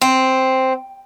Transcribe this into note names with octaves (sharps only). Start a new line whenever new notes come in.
C4